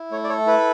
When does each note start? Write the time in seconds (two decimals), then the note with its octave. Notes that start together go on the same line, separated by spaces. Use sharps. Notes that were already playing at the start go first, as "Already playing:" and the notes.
Already playing: E4
0.11 A3 C#5
0.24 D5
0.29 A4 C#5
0.47 E4 B4